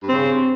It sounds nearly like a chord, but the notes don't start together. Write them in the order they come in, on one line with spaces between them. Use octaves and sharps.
G2 C4 C#3